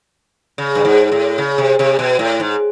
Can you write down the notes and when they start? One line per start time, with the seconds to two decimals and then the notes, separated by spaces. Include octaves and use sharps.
0.58 C#3
0.75 G2
0.85 G#2
1.12 A2
1.38 C#3
1.58 C3
1.79 C3
1.99 B2
2.19 A2
2.40 G#2